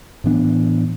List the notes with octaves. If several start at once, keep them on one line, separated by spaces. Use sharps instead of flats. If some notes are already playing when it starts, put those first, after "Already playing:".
A2 E3 B3 D4